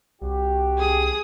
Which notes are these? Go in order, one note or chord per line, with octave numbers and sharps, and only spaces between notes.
C2 F#4 G4
G#4 D#6